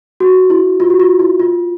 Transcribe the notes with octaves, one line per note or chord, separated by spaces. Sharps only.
F#4
E4
F4
F#4
F4
E4
F4